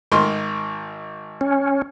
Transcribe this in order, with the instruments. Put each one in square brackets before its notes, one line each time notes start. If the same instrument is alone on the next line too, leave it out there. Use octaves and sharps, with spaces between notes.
[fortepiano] G#1 D#3 C6
[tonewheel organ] C#4